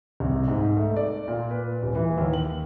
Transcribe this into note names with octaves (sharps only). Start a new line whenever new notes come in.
C2
G#2
A3
D5
A#2
B4
D#1
E3
D#2
F#7